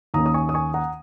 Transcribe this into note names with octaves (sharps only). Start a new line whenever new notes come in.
D#2 D#3 A#3 C#4 A#5 D#6
D#6
G#5 C#6
D#6
G#5 C#6
F#5 A#5